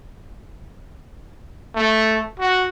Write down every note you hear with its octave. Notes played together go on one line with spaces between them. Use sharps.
A3
F#4